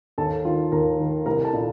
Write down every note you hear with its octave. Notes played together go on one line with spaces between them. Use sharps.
D#2 A4 A5
D#3 F4 F5
D#2 A#4 A#5
D#3
C2 A#4 A#5
A4 A5
A#2